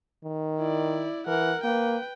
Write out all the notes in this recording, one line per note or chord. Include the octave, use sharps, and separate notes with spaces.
D#3
E4 D5
E3 A#4 F#5
A#3 B4 G5